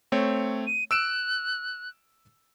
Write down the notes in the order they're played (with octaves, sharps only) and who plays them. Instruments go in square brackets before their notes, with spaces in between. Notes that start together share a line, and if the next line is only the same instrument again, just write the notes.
[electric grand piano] A3 C4 C#5
[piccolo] D#7
[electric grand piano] E6 D7 E7 [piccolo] F#6